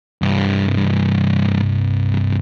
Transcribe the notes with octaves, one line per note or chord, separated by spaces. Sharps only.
C2 G2